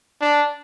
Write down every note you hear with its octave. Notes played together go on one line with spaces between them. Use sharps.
D4